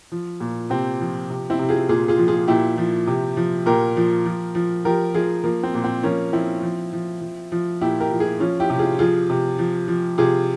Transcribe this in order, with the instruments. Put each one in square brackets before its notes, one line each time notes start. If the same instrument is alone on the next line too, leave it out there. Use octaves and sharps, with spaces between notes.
[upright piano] F3
A#2
C3 C4
F3
C3
C4 E4
C3
F4 G#4
A#2 F4 G#4
F4 G#4
F3
F4 G#4
A#2 E4 G4
F3
C3
F3
A#2 G4 A#4
F3
F3
F3
F3 G4 A#4
F3 F4 G#4
F3 A#3
C4
A#2
C4
F3 A#3 C#4
F3 C4 E4
F3
F3
F3
F3
A#2 E4 G4
G4 A#4
F3
F4 G#4
F3 C#4 F4
E4 G4
C3
F4 G#4
F3 F4 G#4
C3
F3
F3
C3 F4 G#4